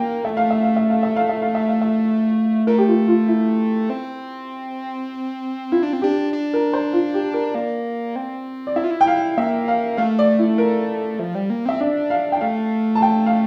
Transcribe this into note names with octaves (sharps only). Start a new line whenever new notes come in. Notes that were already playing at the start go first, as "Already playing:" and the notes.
Already playing: A#3 G5
A3 E5
F5
E5
F5
E5
F5
E5
F5
E5
F5
E5
F5
E5
A3 A#4
G4
F4
F4
E4
C4
E4 F4
D4
C4
D4 G4
D4
A#4
C5
F4
G4
A#4
A#3 D5
C4
D5
E4 E5
F4
E4
G5
F5
A#3 E5
F5
A3 F5
D5
E4
A#4
F3
G3
A#3
C4 E5
D4 D5
F5
G5
A3 F5
A5
G5
F5